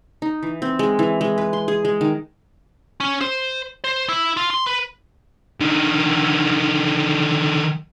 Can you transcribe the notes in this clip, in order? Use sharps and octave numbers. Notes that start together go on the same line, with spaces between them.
D#4
E3
C4
G#3
E3
G#3
B4
C6
G#4
G#3
D#3
C#4
C5
C5
E4
F4
C6
B4
D3 D#3